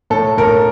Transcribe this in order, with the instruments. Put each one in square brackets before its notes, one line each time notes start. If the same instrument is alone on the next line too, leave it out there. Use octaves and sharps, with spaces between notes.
[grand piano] A2 [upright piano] A4
[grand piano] A2 [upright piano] A#4